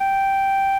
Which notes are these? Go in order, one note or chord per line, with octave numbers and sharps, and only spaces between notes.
G5